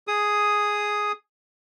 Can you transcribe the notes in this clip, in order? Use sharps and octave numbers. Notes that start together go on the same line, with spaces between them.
G#4 D#6